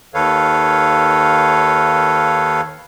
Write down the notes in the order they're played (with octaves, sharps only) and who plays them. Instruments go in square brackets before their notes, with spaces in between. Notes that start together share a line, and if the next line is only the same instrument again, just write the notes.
[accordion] D#2 D#3 A4 B4 C#5 F5